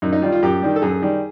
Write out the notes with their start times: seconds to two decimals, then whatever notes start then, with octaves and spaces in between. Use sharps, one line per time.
0.02 F#2 D#4
0.13 D#4
0.22 D#3 G3 F4
0.32 F4
0.43 F#2 G4
0.62 D#3 G3
0.76 A4
0.82 F#2 G#4
1.02 D#3 G3